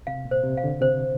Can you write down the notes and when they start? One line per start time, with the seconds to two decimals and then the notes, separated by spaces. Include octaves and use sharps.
0.07 C3 F5
0.25 A#2
0.31 C5
0.44 C3
0.57 F5
0.64 D3
0.81 C3 C5